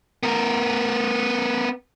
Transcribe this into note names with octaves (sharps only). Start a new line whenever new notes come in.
B3 A#4